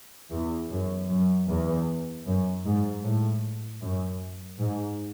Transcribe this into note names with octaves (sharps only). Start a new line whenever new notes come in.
E2
F#2
F#2
E2
F#2
G#2
A2
F#2
G#2